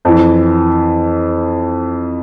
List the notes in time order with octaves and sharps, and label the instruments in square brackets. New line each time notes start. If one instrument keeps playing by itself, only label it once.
[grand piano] F2 E3